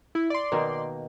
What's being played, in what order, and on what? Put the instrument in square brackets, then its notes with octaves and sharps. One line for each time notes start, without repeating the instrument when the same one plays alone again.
[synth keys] E4
D5 C6
[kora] B2 D#3 A#3